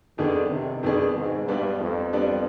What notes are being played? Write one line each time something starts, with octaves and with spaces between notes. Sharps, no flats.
F2 D3 D#3 B3 D4 G#4
C3
F2 B2 D#3 B3 D4 G#4
G#2
G2 G3 B3 D4
F2
G3 B3 D4